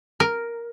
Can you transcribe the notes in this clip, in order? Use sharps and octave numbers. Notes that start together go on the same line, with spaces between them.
A#4